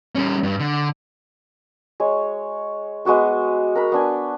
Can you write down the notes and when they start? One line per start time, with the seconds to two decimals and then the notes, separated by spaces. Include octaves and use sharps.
0.15 G3 C#4
0.43 G2
0.60 D3
2.00 G#3 C#5
3.05 G#3 B3 F#4 D6
3.75 A#4 A#5 B5
3.92 B3 D4 G#5